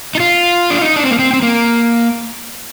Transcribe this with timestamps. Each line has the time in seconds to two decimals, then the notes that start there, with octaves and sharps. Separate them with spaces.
0.15 D#4
0.20 F4
0.70 D4
0.81 D#4
0.96 D4
1.03 C4
1.11 A#3
1.19 C4
1.33 C4
1.42 A#3